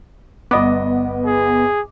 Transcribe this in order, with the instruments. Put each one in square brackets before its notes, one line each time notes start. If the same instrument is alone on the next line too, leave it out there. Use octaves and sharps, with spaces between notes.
[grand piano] G1 D#5 D6 [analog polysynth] B3
[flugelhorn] G#4